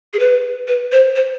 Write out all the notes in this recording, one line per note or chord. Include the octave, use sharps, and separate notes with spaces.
G#4
B4
B4
C5
C5